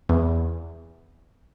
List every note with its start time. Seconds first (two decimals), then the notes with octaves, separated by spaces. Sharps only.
0.09 E2